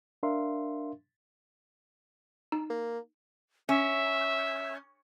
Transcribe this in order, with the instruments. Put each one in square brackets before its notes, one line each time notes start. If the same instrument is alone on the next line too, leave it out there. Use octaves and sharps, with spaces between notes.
[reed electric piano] D4 A#4 E5 F5 C6
[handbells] D#4
[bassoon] A#3
[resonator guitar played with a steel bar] C#4 [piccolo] E5